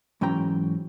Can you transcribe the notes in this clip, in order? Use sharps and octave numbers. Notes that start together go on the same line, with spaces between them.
G#2 E3 F#3 C#4 G5 A#5